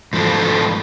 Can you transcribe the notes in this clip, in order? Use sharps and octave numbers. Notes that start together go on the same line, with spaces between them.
G#2 F3 A3 B3 F#4 A4